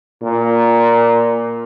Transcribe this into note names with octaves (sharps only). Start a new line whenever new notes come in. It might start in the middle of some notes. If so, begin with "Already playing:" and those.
A#2